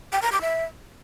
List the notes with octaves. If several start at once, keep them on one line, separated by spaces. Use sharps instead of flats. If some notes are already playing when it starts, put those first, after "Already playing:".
G5
A#5
D6
E5